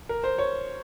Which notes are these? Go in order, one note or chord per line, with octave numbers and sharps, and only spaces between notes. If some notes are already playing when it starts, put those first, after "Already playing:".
A#4
C5
C#5